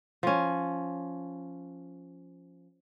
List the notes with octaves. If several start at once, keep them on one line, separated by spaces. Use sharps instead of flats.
F3 C#4